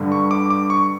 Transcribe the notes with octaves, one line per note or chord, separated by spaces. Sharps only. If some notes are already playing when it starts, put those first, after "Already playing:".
Already playing: G2 D3 G3
C#6
D6
D6
C#6